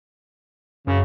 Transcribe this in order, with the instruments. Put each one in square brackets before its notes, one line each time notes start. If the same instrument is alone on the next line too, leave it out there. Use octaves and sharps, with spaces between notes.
[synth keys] F#2 [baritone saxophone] C#3